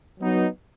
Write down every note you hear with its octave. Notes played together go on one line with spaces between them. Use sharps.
F#3 B3 D#4